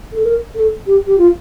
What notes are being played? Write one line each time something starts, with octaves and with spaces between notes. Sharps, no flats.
A4
A#4
A4
G4
G4
F4